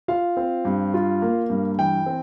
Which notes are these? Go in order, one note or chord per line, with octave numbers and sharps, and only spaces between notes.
F4 F5
C4
G2
F4
A#3
G2
E3 G5
C4